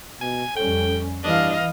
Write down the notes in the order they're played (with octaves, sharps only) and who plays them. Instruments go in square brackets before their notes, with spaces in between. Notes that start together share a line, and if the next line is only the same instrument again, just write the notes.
[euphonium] B2 [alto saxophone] G#5
[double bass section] F2 G3 C#4 [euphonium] A4 [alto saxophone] G5
[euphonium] G2 [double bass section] E3 [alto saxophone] D4 [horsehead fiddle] D#5 F5